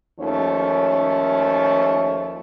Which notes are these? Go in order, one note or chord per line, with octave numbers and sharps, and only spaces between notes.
D#2 F3 A3 C#4 C#5